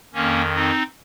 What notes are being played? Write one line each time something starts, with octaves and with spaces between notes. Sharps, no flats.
F2 D#3 A#3 C#4
C4 D#4